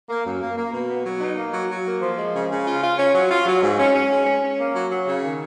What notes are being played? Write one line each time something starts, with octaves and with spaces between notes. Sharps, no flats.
A#3
F#2
A#3
A#3
B2
B3
F#3
D#4
A#3
F#3
F#3
A#3
F3
G#3
C#3
C#3
F4
F4
C#4
F#3
F4
F#3
G#2
C#4
C#4
G#3
C#4
C#4
A#3
F#3
F#3
C#3
D#3